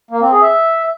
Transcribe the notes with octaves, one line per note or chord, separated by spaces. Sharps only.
A#3
C4
G#4
E5